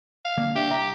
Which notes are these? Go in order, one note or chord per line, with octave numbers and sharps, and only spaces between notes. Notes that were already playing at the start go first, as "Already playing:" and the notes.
F5
D3 A#3
D4 G4 E5
C2 E5 A#5